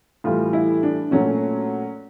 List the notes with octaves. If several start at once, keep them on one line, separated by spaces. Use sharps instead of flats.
A2 E3 G3 F4
E4
D4
A#2 F#3 A3 C#4